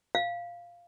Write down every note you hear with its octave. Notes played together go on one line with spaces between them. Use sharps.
F5